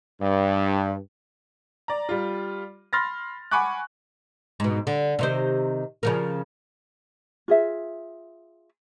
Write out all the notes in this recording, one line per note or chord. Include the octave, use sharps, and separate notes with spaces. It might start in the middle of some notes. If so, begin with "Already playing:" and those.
G2
D5 A#5
G3 F4
B5 C6 F6 A6 A#6
F#5 G#5 B5 C#6 D6 F#6
G#2 B2
D3
C3 D#3 C5
C#3 F3 A#4
F4 G#4 E5